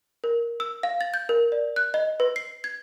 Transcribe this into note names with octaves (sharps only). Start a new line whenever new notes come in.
A#4
E6
F5
A6
G6
A#4
D5
F#6
D#5
B4
C7
G#6